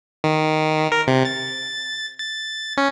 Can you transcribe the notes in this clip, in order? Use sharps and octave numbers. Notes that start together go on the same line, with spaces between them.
D#3
A#4
C3
A6
A6
C#4